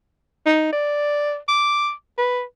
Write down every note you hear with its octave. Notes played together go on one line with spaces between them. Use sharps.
D#4
D5
D6
B4